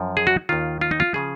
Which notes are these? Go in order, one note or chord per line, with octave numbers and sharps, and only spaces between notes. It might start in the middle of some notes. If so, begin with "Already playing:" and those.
Already playing: F#2 F3
G#4
F#4
D#2 D#3 F4
F4
D#4
F4
C#3 F3 G#4